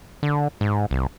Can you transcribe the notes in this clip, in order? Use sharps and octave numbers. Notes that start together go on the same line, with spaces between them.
D3
G#2
C2